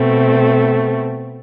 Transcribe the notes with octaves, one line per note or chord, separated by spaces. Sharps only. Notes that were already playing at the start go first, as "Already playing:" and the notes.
Already playing: B2 A3 C4